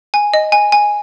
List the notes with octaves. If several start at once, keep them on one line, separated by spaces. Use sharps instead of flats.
G#5
D#5
G#5
G#5